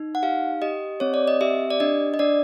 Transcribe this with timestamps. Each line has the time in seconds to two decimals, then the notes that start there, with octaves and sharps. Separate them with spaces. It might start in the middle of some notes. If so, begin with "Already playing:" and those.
Already playing: D#4
0.15 F#5
0.23 G4 F5
0.62 G4 D#5
1.00 C4 C#5
1.14 D5
1.28 D#5
1.41 G4 E5
1.71 D5
1.80 D4 D#5
2.14 D#5
2.19 D4 D5